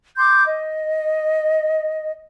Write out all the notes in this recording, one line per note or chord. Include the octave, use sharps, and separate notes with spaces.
C6 D6 G6
D#5